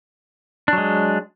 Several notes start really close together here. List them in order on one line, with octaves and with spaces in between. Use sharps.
D4 F#3 G#3